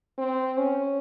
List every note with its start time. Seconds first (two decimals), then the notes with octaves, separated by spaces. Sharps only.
0.18 C4
0.58 C#4